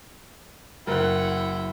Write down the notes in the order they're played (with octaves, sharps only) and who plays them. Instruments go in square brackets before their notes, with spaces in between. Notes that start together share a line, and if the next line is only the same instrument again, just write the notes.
[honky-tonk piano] F#1 F#6 [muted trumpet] E4 [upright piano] A#4 [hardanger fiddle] F#5 G5